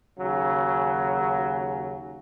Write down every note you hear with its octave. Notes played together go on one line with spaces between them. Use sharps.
D#2 C#3 F#3